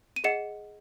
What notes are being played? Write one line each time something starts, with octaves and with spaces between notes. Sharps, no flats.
D#7
G#4 D#5 F#5 C#7 E7